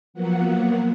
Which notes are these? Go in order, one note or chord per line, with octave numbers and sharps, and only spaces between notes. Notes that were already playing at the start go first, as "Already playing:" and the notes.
F3 F#3 A#3 B3 F#5